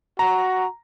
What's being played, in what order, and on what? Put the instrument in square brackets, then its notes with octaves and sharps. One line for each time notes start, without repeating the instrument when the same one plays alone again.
[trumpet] F#4 [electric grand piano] A#5